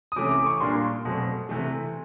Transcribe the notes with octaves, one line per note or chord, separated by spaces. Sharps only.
D#6
C3 E3 A3 C#4 D6
D6
C#6
A#2 G3 A#3 D4 C6
B2 F#3 A3 C4
C3 E3 A3